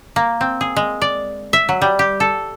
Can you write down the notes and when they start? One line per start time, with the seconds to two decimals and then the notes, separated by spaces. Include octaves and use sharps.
0.16 A#3
0.41 C4
0.61 G#4
0.76 G#3
1.02 D5
1.53 E5
1.69 F#3
1.82 G3
1.99 G4
2.20 A4